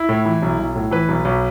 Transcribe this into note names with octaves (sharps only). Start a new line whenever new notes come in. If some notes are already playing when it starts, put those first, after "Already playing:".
Already playing: E4
A2
E3
B1
B1
A2
E3 B4
B1
B1